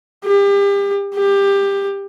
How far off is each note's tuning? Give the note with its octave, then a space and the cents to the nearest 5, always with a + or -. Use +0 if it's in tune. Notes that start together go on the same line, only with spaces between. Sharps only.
G4 +35
G4 +20